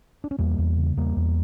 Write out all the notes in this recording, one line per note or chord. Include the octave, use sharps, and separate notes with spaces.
D4
C#4
E2 G3 A#3
E2
C#3
E2 G3 A#3
E2